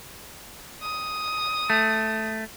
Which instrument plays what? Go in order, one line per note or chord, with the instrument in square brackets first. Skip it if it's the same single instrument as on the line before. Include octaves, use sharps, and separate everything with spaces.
[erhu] D#6
[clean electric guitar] A3